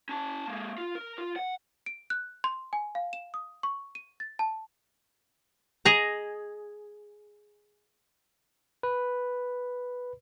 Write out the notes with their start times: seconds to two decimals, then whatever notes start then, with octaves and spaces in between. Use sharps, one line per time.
0.09 C#4 A5
0.48 G#3 A#3
0.78 F4
0.95 A#4
1.18 F4
1.36 F#5
1.86 D7
2.10 F#6
2.44 C6
2.73 G#5
2.95 F5
3.13 E7
3.34 D#6
3.63 C#6
3.95 D#7
4.20 A6
4.39 A5
5.85 G#4 D#5 A#5
8.83 B4